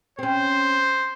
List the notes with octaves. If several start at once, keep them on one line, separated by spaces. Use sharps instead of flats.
C4 C#4 C5